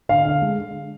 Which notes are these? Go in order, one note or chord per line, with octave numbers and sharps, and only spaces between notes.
D3 F5
D3
G#3